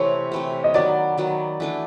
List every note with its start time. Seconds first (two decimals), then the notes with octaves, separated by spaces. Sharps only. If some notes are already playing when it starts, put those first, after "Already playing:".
Already playing: C3 E3 A3 C4 C#5
0.32 C3 E3 A3 C4
0.64 D#5
0.74 D#3 F#3 B3 D5
1.18 D#3 F#3 B3
1.60 E3 A3 D4